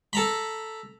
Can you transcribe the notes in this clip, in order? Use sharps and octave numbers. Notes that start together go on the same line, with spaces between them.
A4 A#5 B5